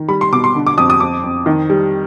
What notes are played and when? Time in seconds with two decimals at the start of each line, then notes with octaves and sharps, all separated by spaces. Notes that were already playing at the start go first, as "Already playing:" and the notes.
Already playing: D#3
0.09 G3 B5
0.21 C6
0.32 B2 D6
0.44 C6
0.56 D3
0.66 D6
0.77 F2 D#6
0.90 D#6
1.00 F2 D6
1.24 F2
1.46 D#3
1.70 G3